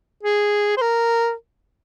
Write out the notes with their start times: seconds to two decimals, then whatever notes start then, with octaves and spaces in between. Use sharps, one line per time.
0.23 G#4
0.77 C5
0.81 A#4